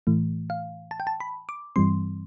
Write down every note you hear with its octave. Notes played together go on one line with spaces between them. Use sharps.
A2 E3 A3
F5
A5
G5
A5
B5
D6
G2 E3 G3 C4 C6